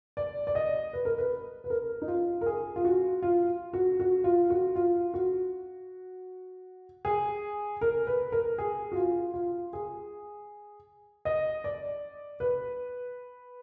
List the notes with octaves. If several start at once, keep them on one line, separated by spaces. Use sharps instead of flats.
D5
D5
D#5
B4
A#4
B4
B4
A#4
D#4
F4
A#4
G#4
F4
F#4
F4
F#4
F#4
F4
F#4
F4
F#4
G#4
A#4
B4
A#4
G#4
F#4
F4
F4
G#4
D#5
D5
B4